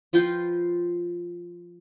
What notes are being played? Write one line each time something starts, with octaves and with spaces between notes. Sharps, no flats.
F3 F4 B4 G5